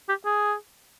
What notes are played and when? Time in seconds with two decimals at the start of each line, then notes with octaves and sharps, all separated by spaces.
0.09 G4
0.25 G#4